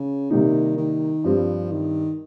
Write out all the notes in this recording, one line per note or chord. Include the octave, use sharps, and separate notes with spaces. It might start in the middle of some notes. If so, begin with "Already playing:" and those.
Already playing: C#3
C3 D#3 G3 A#3 D#4
D#3
G2 F3 G3 C4
D#3